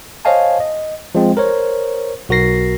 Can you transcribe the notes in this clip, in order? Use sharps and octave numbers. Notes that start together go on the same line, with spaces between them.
C5 C#5 D#5 F5 G#5 A5
D#5
F3 G#3 C4
A#4 C5 C#5
B1 F#4 A#4 A#6 C7